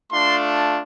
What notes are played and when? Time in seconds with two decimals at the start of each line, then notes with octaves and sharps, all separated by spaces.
0.12 A3 D4 F4 C6